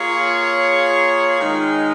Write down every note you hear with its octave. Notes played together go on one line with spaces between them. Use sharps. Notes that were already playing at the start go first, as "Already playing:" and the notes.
Already playing: A#3 F4 G#4 C#5
D#3 G#3 D#4